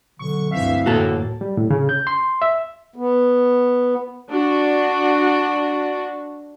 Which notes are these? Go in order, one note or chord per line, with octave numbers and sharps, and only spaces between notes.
B1 D3 C#6
D2 G2 E3 C4 E5 F5
F#2 A2 D3 A#3 F#4 A4
G3
A2
C#3
G6
C6
E5
B3
D4 F#4